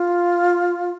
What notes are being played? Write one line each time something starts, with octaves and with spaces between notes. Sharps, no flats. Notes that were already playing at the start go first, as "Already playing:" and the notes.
Already playing: F4